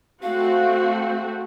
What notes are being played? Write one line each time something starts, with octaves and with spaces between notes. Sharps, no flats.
A3 C4 F#4 F5